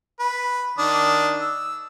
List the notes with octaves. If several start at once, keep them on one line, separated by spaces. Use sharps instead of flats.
B4
D#3 D4 D#6
E6